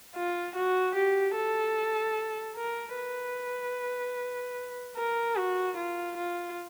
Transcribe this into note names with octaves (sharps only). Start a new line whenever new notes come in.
F4
F#4
G4
A4
A#4
B4
A#4
F#4
F4
F4